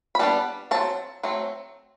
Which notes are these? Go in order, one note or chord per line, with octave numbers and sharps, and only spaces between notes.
B5
G3 B3 D4 A5
F#3 C4 A5
F#3 A3 C4